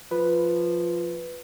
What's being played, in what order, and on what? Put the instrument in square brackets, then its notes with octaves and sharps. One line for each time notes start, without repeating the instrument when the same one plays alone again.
[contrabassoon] F3 [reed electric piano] B4